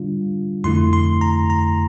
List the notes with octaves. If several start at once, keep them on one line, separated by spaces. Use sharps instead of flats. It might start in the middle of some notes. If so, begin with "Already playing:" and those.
Already playing: D3 G3 D4 F4
F2 D3 A3 E4 C6
C6
A#5
A#5